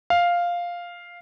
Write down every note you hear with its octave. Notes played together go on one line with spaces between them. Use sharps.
F5